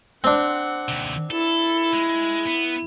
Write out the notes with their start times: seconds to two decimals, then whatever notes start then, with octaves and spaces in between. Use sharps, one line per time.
0.24 C4 D4 F#5
0.88 D#2 C3
1.31 E4 A4
1.93 G#3
2.47 B3